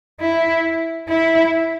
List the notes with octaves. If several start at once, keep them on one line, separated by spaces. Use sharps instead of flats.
E4
E4